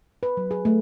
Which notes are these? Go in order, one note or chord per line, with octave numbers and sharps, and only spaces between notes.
B4
F#3
G#4
A3